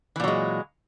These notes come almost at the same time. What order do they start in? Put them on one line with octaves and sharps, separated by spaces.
E3 A#2 F#3 G#3